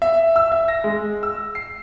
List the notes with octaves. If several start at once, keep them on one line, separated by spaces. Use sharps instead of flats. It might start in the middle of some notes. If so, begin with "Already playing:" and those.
E5
E6
E5
A#6
G#3
E6
C7